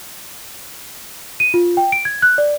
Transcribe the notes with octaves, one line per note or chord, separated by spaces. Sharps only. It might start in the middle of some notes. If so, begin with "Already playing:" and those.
D#7
F4
G5
D7
G#6
F#6
D5